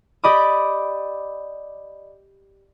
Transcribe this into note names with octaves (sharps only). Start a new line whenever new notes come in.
G4 D5 D#5 B5 D6 D#6